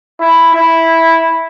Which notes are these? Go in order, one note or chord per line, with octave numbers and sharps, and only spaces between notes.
E4
E4